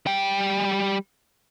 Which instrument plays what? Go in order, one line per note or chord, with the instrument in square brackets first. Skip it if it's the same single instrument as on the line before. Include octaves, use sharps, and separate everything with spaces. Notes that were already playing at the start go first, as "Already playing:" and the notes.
[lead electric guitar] G3 G5